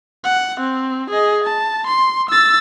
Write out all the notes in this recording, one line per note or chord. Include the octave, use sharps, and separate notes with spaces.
F#5
C4
G#4 D#5
A5
C6
E6 A6